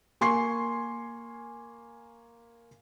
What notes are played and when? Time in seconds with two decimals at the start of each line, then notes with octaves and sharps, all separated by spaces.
0.21 A#3 G#5 C6 C#6 C7